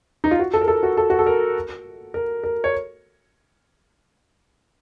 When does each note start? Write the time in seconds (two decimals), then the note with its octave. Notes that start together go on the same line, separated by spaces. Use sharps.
0.24 D#4
0.31 F4
0.39 F#4
0.54 A4
0.61 A#4
0.68 A4
0.83 F#4
0.97 A4
1.10 F#4
1.19 A4
1.26 A#4
2.14 A#4
2.44 A#4
2.64 C#5